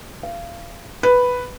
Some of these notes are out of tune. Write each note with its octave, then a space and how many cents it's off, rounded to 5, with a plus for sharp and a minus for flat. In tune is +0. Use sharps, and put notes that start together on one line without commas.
F5 -30
B4 +0